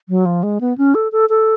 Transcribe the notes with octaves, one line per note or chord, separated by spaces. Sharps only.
F#3
F3
G#3
B3
C#4
A4
A4
A4